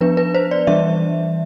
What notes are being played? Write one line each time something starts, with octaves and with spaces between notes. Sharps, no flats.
F3 B3 D4 B4
B4
C5
D5
E3 G3 D4 E5